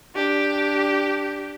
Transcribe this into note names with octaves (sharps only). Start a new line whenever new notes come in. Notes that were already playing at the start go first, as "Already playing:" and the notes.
D4 G4